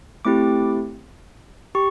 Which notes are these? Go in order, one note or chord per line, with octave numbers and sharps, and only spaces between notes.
A3 C4 E4 G4 D6
G4 C#6